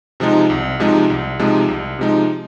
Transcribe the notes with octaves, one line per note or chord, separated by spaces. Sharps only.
C3 F3 G#3 D#4
C2
C3 F3 G#3 D#4
C2
C3 F3 G#3 D#4
C2
C3 F3 G#3 D#4